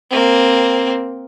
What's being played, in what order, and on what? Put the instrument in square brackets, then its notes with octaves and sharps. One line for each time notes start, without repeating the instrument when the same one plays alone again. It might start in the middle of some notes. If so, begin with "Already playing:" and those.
[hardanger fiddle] A#3 C4